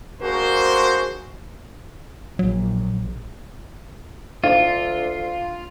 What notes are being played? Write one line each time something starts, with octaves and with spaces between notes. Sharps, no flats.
A#3 D4 F#4 G#4 A#4 C5
A#1 F#3
D2 D4 F4 F5